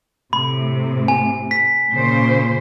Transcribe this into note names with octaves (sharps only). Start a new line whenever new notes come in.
A2 C3 B5
G#5
B6
A#2 C#3 C5